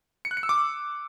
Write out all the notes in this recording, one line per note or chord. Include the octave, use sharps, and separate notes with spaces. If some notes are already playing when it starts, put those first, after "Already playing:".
C#7
F#6
C#7
E6
D6